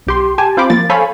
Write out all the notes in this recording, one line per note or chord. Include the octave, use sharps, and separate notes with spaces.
B1 G4 C6
G4 G#5 A5
C4 F4 C5 B5 D6
F3 A#3 A6
A4 C5 C#5 F5 G#5 B5